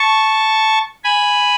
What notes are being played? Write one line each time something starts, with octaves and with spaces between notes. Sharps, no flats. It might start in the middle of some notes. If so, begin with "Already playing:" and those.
Already playing: A5 C#6
G#5 B5